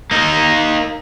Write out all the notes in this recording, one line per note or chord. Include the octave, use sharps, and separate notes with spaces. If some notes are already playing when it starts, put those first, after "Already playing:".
A#3 D#4